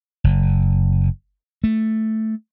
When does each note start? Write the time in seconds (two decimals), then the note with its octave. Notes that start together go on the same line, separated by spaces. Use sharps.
0.24 F#1
1.64 A3